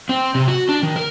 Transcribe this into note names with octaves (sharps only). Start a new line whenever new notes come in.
C4
C3
F#4
D4
D#3
A#4